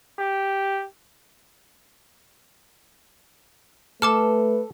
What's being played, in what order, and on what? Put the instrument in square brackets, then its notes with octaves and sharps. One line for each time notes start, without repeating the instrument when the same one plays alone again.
[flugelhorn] G4
[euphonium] A3 [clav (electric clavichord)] A4 [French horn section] B4 [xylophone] A5 D6 F6